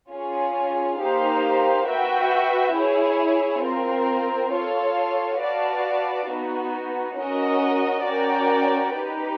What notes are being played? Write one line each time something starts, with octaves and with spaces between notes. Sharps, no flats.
C#4 F4 G#4 C#5
A#3 D#4 G4 C5 F5
F#4 B4 E5 G5
E4 G#4 C#5
C4 F4 A#4
F4 A4 C#5 F5
F#4 B4 D5 F5 A5
B3 D#4 F#4
C#4 F#4 A#4 D#5
C#4 F#4 A#4 D5 G5
D#4 G4 B4